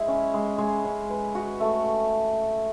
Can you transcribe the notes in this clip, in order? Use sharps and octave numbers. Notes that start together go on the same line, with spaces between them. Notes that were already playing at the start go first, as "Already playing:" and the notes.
Already playing: G#3 E4
C#4
G#3
G#3
C#4
B4
F#4
A3